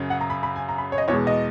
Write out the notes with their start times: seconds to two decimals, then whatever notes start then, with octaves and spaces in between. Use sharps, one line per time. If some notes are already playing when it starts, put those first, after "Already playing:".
Already playing: F#2 C#3 F#3
0.10 F#5
0.21 A#5
0.30 B5
0.43 B5
0.56 G#5
0.69 A#5
0.78 B5
0.92 C#5
0.98 D#5
1.08 E2 B2 G#3 C#5
1.27 D#5